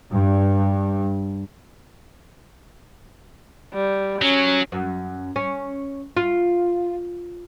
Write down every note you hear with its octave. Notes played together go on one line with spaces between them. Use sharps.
G2
G3
F#3 C#4
F#2
C#4
F4